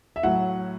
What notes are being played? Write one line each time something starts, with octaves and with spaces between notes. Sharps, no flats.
E5
A2 F#3 F#5